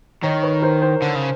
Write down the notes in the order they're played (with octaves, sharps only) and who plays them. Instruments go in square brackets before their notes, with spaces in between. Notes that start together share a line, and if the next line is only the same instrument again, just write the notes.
[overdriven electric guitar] D#3 [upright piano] C#5 D#5
[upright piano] B4 C#5
A#4 C5
A#4 C5
[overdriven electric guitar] D3
C#3